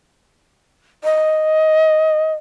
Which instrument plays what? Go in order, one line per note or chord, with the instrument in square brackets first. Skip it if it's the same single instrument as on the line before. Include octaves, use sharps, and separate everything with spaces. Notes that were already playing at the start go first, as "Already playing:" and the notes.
[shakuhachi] D#5